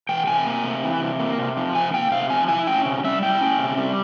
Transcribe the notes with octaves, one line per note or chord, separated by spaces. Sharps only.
E3 G5
C3 G#5
A#3
C3
E3
C3
A#3
C3
F3
C3 G#5
A#3 G5
C3 F5
F3 G#5
E4 G#5
C#4 G5
C3
G3 E5
E4 G5
C#4
C3
G3